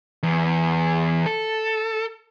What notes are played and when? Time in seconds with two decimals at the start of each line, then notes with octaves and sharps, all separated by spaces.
0.23 E2
1.26 A4